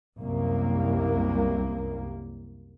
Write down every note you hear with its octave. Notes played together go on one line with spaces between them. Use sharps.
C2 F#2 A#3